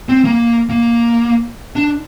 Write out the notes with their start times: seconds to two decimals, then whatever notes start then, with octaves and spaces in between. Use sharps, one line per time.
0.09 C4
0.25 A#3
0.69 A#3
1.76 D4